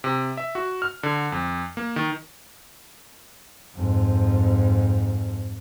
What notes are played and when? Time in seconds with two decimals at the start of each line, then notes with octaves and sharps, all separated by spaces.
0.04 C3
0.37 E5
0.55 F#4
0.82 F6
1.03 D3
1.32 F2
1.77 A#3
1.96 D#3
3.76 F2 G#2